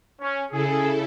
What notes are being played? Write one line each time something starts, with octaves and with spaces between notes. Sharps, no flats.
C#4
C#3 E4 G#4 A4